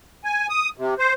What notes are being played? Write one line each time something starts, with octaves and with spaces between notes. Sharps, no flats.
G#5
D#6
C3
C5